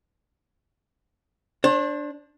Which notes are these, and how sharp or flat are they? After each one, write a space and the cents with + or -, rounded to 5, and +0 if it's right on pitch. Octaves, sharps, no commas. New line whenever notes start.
D4 +0 C5 +40